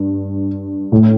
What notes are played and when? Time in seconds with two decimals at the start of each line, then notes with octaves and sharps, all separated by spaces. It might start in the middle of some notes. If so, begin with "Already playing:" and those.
Already playing: G2
0.92 A2